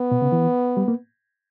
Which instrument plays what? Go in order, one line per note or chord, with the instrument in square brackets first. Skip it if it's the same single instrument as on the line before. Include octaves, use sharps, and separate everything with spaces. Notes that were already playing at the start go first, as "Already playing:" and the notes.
Already playing: [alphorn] B3
[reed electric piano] B2
C#3
E3
G3
A#3